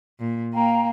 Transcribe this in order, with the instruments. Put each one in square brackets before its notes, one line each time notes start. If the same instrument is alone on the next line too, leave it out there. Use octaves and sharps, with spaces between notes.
[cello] A#2
[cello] A#3 [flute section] F5 G5 A#5